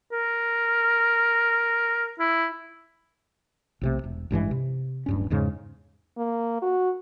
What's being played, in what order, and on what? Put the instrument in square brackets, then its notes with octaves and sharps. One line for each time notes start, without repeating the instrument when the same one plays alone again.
[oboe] A#4
E4
[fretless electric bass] B1 C3 A3
E1
A1 G2 E3 G#3
C3
D1 G2 C#4
E2 G#2 C#3 G#3
[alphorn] A#3
F#4